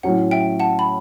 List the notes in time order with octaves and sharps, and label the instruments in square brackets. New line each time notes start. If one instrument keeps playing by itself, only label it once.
[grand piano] A2 F#3 C#4 [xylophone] F#5
[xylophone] E5 G5
F#5 A5
B5